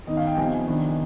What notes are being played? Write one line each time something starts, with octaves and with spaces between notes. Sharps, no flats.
D#3 B3 D#4 D#5
F5
G5
C3 F3 B3 G#5
D#3 B3 D4